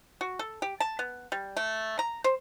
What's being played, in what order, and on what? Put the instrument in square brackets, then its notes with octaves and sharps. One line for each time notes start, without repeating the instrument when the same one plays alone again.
[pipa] F#4
A4
G4
A5
B3
G3
A3
A#5
C5